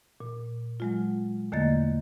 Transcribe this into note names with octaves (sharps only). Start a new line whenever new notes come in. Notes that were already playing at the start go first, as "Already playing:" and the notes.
A#2
F#3 G#3 F4
E2 D3 A3 A#3 D#5 A6